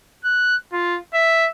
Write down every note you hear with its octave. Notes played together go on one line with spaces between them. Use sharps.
F#6
F4
E5